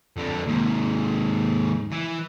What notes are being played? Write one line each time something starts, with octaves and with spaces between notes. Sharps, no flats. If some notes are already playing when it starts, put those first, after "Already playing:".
F2 D3
D#2 G#2
E3